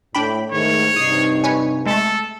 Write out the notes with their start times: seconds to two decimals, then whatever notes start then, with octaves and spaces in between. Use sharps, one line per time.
0.15 A2 D4 G5 B5
0.51 G#2 D#3 A3 C#5
0.96 G2 C3 D#4 D#6 C7
1.44 B4 C#5 G#5
1.86 G#3 A3 A4